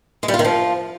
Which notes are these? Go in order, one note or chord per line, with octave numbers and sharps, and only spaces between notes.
G#3
G3
F4
D#3
F3